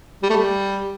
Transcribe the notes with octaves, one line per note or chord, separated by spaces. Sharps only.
G3
A3
G3